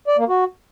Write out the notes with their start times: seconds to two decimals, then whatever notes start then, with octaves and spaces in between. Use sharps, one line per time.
0.07 D5
0.18 A#3
0.29 F#4